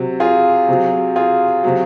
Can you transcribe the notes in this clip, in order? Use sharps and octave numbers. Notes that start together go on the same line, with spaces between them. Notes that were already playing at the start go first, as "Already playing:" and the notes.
Already playing: C3 F#3
F4 G#4
C3 F#3
F4 G#4
C3 F#3